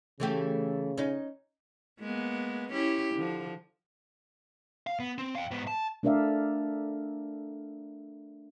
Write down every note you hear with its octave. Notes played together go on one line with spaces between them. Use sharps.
C#3 E3 A3 G4
C#4 D#4
G#3 A#3 B3
C#4 E4 G4
D3 F3
F5
B3
C4
F5 G5
G#2 B3
A5
A3 D4 A#4 D5 E5 F5